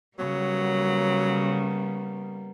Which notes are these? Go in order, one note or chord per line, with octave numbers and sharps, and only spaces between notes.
C#3 F#3 G3 A#3 B3